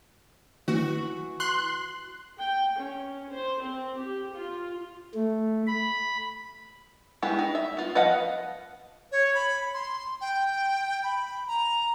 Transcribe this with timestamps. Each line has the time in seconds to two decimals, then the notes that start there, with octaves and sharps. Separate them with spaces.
0.68 E3 F#4
1.40 C6 F#6
2.41 G5
2.80 C#4
3.32 C5
3.62 C4
3.99 G4
4.35 F4
5.14 A3
5.67 B5
7.22 G#3 B3 E4 G4
7.39 D#4
7.55 E5
7.77 B3 F4
7.95 F3 B4 D#5 F5 F#5
9.12 C#5
9.35 B5
9.74 C6
10.21 G5
11.03 B5
11.47 A#5